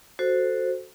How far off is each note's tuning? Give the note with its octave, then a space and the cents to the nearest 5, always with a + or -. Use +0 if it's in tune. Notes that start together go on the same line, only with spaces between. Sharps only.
F#4 +0 A4 +5 C5 +0